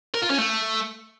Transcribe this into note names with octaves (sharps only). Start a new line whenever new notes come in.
A#4
F4
C#4
A3